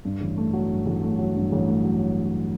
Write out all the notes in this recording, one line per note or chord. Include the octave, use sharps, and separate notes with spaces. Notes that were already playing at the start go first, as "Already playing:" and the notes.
G2
A1
A3
F#3
G2
A1
A3
F#3
G2
A1
A3
F#3